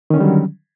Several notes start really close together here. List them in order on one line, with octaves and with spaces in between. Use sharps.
D#3 C#4 D3 G3 F#3